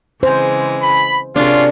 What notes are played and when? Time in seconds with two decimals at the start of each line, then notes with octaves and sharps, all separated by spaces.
0.23 C#3 E3 G#3 C5
0.83 B5
1.36 C3 C#4 D4 F4 G#4 A#4